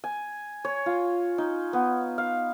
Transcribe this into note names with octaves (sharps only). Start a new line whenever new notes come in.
G#5
C#5
F4
D#4
B3
F5